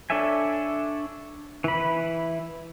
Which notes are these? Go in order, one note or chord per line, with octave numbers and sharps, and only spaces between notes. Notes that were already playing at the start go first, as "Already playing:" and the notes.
D4 A4 C#5 E5 G#5
E3 B5